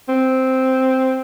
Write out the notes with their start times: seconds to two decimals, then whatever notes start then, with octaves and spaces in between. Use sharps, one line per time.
0.09 C4